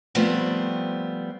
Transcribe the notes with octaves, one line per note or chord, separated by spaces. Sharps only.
F3 G3 A3 B3 C4